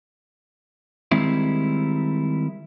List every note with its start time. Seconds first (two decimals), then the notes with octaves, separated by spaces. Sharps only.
1.12 D#3 G3 G#3 C4 E4